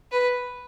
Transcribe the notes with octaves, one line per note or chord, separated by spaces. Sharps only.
B4